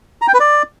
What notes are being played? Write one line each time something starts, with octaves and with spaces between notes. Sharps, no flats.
A#5
G5
B4
D5